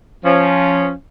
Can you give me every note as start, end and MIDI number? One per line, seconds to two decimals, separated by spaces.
0.24 0.90 53
0.24 0.90 61